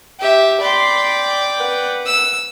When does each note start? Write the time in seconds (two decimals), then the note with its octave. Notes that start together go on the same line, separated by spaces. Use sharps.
0.20 G4 E5
0.61 D5 G5 B5 C6
1.57 B4 F#5
2.06 E6